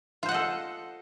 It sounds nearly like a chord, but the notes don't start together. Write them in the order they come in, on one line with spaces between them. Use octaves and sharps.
F4 C5 F#5 D#5 A4